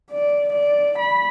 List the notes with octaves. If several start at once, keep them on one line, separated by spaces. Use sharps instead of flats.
D5
D5
B5